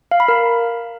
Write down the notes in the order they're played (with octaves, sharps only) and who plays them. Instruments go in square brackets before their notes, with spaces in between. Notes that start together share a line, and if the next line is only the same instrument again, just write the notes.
[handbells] F5
B5
A#4